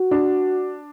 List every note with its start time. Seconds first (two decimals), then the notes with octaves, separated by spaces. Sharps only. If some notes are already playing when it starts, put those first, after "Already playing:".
Already playing: F#4
0.11 D4